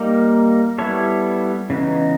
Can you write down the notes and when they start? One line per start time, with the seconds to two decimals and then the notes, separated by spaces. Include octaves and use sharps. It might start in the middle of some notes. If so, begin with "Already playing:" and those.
Already playing: G3 A#3 D#4
0.78 G3 B3 E4 A4 C#5
1.70 C#3 E3 G#3 B3 D#4